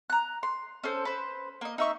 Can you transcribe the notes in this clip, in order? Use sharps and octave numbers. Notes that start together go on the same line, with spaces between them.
A#5 F#6
C6
C#4 A4 C5
B4 C5
A#3 D#5
D#4 E5 C#6